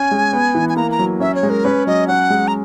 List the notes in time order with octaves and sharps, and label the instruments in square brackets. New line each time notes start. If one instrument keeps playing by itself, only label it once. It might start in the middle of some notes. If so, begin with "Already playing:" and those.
Already playing: [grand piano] C#4 [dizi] G#5
[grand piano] G#3
B3
E3
[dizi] G#5
[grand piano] A#3 [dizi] A#5
[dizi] A#5
[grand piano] F#3
[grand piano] C#4 [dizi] E5
[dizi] C#5
[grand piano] G#3
[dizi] A#4
[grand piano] C#4 [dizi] B4
[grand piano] F#3 [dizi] D#5
[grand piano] C#4 [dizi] F#5
[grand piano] G#3
[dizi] A#5